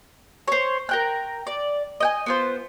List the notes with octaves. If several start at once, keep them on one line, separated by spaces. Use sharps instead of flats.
C5 C#5
A#4 G5 F#6
D5
D#5 G5 G#5
B3 F4 C5